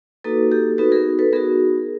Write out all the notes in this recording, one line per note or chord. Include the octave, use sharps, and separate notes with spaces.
A#3 D#4 F#4 A4 B4
G4 A4
B3 D#4 F#4 A4 B4
G#4 A#4
A4 B4
B3 D#4 F#4 G#4 A#4